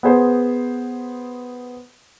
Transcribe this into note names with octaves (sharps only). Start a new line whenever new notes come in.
B3 G#4 C5